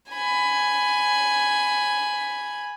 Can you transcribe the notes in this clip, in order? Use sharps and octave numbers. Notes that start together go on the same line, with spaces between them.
G#5 B5